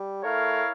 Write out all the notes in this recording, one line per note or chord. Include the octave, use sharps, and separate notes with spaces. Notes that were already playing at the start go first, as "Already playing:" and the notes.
Already playing: G3
A3 E4 A#4 C#5 F5